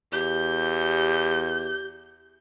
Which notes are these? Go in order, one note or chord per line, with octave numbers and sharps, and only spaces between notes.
E2 G4 G6